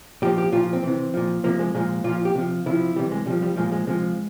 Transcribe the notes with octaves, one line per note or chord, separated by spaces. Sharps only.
A#2 F3 G4
G4
A#2 F3 F4
C4
C3 E3
A#2 F3
C3 F3 A#3
G#3
A#2 F3 G#3
A#2 F3 F4
G4
C3 F3
C3 F3 E4
C3 E3 G3
G#3
C3 F3 G3
G3
A#2 F3 G#3
G#3
C3 F3 G#3